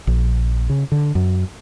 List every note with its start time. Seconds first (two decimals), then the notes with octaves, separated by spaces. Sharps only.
0.07 A#1
0.70 C#3
0.92 D3
1.15 F#2